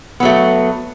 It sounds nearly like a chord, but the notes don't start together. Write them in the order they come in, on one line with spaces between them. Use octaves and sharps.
B3 F#3 A3